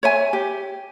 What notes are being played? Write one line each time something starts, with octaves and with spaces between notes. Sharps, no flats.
C#5 E5 G#5
G4